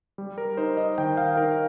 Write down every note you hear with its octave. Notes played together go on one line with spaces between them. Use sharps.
G3
A#4
D#4 C5
D#5
D#3 G5
F5
D#4 A#4